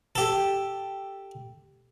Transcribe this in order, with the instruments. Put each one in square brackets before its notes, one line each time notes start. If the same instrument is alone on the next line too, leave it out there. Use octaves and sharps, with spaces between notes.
[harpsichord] G4 A4